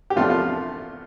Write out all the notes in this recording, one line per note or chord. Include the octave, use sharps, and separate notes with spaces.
G4
E2 C3 F3 A3 D4 F4
F4